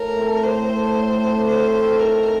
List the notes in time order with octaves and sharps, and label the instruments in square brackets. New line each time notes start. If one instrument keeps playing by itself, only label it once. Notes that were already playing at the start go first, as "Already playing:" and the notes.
Already playing: [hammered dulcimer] A2 [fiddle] A#4
[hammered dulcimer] A3 C4
[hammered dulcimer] A2 [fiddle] C5
[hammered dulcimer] A3 C4
A2
A3 C4
[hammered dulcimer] A2 [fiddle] C5
[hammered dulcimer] A3 C4
[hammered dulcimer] D#3 [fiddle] A#4